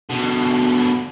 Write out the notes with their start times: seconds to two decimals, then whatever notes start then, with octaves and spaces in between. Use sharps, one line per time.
0.09 B2 D3